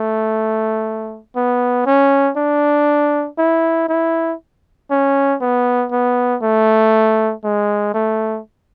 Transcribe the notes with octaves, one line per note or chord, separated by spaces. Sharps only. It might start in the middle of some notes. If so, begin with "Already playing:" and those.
Already playing: A3
B3
C#4
D4
E4
E4
C#4
B3
B3
A3
G#3
A3